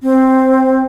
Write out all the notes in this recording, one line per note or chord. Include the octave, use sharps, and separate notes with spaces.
C4